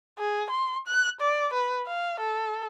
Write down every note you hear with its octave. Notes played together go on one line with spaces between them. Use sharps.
G#4
C6
F#6
D5
B4
F5
A4